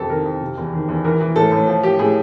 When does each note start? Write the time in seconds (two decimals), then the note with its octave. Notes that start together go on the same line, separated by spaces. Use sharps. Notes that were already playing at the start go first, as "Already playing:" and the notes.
Already playing: F2 C3 A4
0.10 D#3 A#4
0.25 F2
0.41 C3
0.57 E2
0.73 D#3
0.88 E2
1.04 E3 A#4
1.21 E3
1.36 A2 A4
1.52 A2
1.67 F3
1.83 F3 G4
1.99 A2 G#4